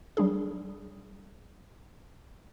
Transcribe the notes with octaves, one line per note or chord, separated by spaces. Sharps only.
F#3 G3 D4 G#4